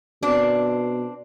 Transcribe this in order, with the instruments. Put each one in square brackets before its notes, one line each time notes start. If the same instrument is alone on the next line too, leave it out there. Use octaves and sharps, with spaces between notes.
[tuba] B2 [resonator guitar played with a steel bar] C4 D4